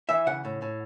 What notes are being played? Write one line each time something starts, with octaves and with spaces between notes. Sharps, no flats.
E3 E5
C#3 F#5
A2
A2